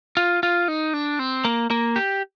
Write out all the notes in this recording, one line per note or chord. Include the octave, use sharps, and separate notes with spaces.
F4
F4
D#4
D4
C4
A#3
A#3
G4